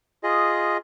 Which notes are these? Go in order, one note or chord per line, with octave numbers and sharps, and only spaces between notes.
F4 G#4 D#5